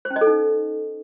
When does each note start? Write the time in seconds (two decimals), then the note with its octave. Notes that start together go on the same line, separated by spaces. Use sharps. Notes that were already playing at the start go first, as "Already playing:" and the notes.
0.05 C5
0.11 C#4
0.16 D#5
0.21 A4
0.27 D#4